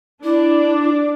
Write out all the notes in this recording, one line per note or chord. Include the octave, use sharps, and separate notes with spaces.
D4 E4 D5